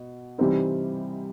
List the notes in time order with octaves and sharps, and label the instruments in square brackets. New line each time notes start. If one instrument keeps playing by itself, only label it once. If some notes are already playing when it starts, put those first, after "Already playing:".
Already playing: [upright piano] B2
C3 E3 G3 C4 D#4